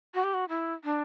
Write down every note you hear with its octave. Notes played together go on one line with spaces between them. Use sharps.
F#4
G4
F#4
E4
D4